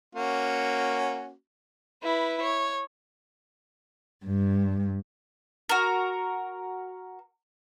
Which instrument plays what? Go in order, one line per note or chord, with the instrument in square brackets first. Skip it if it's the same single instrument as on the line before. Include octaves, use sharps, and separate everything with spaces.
[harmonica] A#3 C#4 F#4
[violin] E4 B4
C#5
[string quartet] G2
[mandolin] F#4 A#4